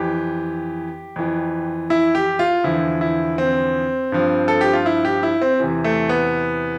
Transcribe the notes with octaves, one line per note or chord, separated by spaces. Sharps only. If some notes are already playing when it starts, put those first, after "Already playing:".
Already playing: F2 E3 G4
F2 E3
E4
G4
F4
E2 D3 F3 E4
E4
C4
G2 F3
A4
G4
F4
E4
G4
E4
C4
E2 C3 E3
A3
B3